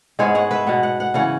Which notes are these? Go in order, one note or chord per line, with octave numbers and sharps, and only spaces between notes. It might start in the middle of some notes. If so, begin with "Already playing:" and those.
G#2 G#3 B3 G#4 C#5
C#5 F#5
B4 E5
B2 B3 F#5
F#5
F#5
C#3 E3 C#4 F#5